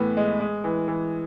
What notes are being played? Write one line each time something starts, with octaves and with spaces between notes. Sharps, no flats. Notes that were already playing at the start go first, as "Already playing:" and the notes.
Already playing: A2 E3 B3
G#3
G#3
E3
E3